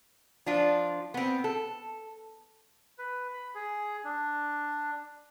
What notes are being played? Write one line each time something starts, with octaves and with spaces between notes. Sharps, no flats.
F3 D4 F4
B3 C4
A4
B4
B5
G#4
D4